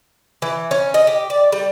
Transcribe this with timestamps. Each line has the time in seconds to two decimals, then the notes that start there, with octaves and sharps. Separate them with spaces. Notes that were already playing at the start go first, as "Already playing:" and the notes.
0.42 E3
0.71 C#4
0.94 D#5
1.07 G4
1.30 D5
1.52 G3